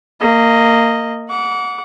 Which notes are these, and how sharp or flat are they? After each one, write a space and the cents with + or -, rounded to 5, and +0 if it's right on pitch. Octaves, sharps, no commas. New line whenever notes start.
A#3 -20 D#5 +0
F#5 -15 D6 -35